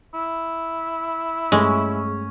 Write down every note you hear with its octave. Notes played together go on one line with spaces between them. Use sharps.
E4
G2 G#3 A3 C#4